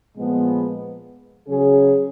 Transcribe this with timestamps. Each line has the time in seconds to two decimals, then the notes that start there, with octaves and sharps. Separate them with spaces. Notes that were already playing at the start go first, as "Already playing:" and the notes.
0.16 A#2 F3 G#3 B3
1.47 C#3 F#3 C#4 G#4